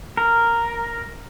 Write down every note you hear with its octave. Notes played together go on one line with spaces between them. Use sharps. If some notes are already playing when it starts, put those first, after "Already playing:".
A#4